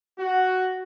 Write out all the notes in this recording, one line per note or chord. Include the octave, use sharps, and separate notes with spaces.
F#4